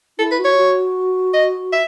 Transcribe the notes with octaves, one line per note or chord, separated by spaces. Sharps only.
E4 A4
B4
F#4
C#5
F#4
D#5
E5